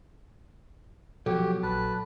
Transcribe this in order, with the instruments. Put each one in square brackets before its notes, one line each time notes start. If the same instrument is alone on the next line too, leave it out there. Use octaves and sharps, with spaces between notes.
[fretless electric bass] B2 F3 [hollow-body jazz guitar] F#3 [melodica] G4 [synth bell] A4
[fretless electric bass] A#1 [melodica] B4 A5